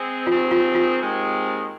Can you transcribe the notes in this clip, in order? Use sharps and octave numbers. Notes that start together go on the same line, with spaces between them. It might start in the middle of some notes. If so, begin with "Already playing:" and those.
Already playing: G#3 C4
D#2 D#3 G#3 C4 F4
F4
F4
D#2 D#3 G#3 C4